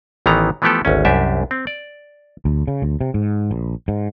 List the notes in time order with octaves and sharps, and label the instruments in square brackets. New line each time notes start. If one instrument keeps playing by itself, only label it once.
[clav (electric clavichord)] A1 D#3 E3 B3 A#5
E3 F3 A3 B3 G4 A4
G#1 D2 C#4
C2 F#2 D4 G4 E5
C4
D5
[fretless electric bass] D2
C#3
D2
C3
G#2
A#1
G#2